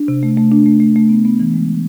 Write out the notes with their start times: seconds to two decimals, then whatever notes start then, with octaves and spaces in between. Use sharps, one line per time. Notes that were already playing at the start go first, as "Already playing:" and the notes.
Already playing: D4
0.08 C3
0.23 A3
0.37 A3
0.51 D4
0.66 A3
0.80 A3
0.96 A3
1.09 B3
1.25 B3
1.40 E3
1.54 G#3